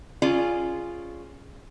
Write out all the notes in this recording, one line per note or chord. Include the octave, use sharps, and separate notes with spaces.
C#4 F4 G#4 D5